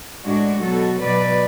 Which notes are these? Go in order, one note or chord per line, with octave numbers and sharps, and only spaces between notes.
A2 G#3 D4 F#4
B2 F#3 F#4 A4
B2 F#3 B4 D5